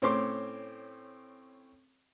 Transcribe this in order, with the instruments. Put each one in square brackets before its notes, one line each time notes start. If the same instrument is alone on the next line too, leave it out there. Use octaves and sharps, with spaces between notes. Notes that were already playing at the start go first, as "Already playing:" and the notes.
[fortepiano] A2 C4 C#4 C6 D6